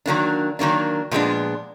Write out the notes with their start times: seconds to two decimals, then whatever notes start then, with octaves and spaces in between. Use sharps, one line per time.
0.06 D#3 F#3 A#3 D4
0.59 D#3 F#3 A#3 D4
1.11 A#2 F3 G#3 B3 D4